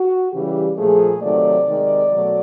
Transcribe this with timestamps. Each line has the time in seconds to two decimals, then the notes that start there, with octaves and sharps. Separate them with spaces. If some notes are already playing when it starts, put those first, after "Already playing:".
Already playing: F#4
0.32 C#3 E3 G3 G4
0.77 A#2 F3 A3 G#4
1.22 C3 D#3 F#3 A3 D5
1.67 C3 D#3 G#3
2.12 B2 F#3 A3